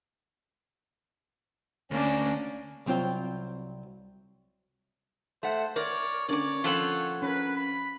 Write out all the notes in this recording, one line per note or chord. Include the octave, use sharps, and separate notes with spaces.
D2 A#3 C#4 D4
C2 F#3 C4 F4 G5
A3 C5 F#5
A#4 C#5 D5
D3 A#3 C#4 C#5 D5 D6
F3 C4 F4 A4 F#5
C#4 A#4 B4
B5